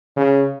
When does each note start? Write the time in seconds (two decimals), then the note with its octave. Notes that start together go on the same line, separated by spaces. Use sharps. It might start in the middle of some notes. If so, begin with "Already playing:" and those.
0.16 C#3